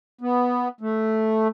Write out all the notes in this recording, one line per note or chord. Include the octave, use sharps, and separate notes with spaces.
B3
A3